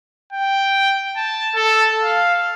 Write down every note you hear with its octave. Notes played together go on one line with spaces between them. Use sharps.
G5
A5
A4
F5